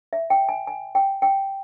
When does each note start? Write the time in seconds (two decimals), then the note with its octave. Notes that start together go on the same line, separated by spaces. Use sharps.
0.13 E5
0.30 G5
0.49 G#5
0.67 G#5
0.95 G5
1.22 G5